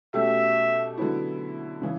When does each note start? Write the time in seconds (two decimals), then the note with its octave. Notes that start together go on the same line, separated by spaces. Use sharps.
0.14 B2 A3 C#4 G4 E5
0.97 D3 F#3 B3 E4
1.82 C#3 E3